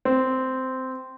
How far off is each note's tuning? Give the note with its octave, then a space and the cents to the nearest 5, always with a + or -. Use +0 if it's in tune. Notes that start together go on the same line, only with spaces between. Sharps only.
C4 -10